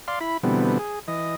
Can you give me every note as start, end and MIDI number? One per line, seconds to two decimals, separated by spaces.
0.08 0.19 74
0.08 0.19 77
0.08 0.19 84
0.21 0.37 64
0.21 0.37 83
0.44 0.78 47
0.44 0.78 50
0.44 0.78 52
0.44 0.78 55
0.44 0.78 59
0.44 0.78 60
0.79 0.99 68
1.08 1.36 52
1.08 1.36 75